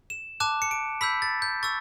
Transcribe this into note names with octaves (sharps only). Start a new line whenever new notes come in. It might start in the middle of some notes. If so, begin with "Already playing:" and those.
E7
A5 D6 F#6 E7
C#7
D7
B5 E6 G6 B6
A6
G6
C#6 E6 A6